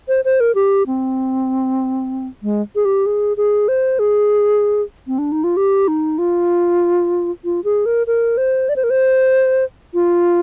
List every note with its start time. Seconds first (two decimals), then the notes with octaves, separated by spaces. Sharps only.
0.08 C5
0.25 C5
0.40 A#4
0.55 G4
0.87 C4
2.43 G#3
2.75 G#4
2.85 G4
3.06 G#4
3.37 G#4
3.68 C5
3.99 G#4
5.07 C4
5.19 D4
5.32 D#4
5.44 F4
5.57 G4
5.88 D#4
6.18 F4
7.45 F4
7.64 G#4
7.86 A#4
8.07 A#4
8.37 C5
8.69 D5
8.76 C5
8.84 A#4
8.90 C5
9.94 F4